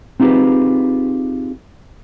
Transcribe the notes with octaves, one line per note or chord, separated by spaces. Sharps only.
C4 D#4 F4 G4 G#4 B4